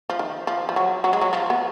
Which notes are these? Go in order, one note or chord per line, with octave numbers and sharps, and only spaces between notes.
F3
D#3
F3
F3
F#3
F#3
G#3
F#3
F3
B3